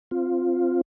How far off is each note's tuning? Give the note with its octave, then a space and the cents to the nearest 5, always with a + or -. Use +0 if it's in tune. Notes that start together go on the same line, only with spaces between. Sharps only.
C4 +0 F4 +0